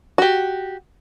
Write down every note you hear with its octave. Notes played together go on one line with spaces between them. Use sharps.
F#4 G4